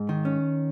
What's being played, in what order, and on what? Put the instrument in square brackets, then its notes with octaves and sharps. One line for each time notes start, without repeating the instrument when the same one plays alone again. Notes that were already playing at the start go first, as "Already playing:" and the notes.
Already playing: [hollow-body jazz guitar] G#2
D#3
C#4